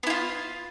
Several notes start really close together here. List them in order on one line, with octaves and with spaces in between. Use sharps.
B3 E4 F4